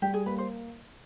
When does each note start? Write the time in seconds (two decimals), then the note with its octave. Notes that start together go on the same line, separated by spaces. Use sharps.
0.02 G3 G4
0.14 G#4
0.26 A#3 B4
0.38 C5